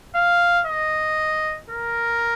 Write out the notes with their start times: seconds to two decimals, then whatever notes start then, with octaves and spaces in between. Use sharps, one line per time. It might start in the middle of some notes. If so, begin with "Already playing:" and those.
0.15 F5
0.67 D#5
1.70 A#4